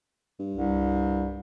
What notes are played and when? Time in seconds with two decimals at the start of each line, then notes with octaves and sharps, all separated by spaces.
0.40 G2
0.55 C2